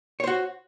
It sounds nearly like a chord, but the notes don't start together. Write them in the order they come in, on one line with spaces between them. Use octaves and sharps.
C#5 C5 F#4